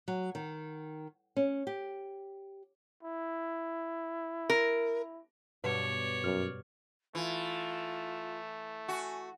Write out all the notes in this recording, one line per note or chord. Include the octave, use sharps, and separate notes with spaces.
F#3
D#3
C#4
G4
E4
A#4
G2 B2 C#5 D5
F#2 F6
E3 A3 F4
F#4 G#5